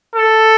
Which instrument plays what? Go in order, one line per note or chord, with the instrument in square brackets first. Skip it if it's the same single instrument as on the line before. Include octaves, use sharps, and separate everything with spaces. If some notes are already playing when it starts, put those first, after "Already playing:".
[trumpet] A4